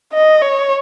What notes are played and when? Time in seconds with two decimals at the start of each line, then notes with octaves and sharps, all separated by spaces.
0.13 D#5
0.42 C#5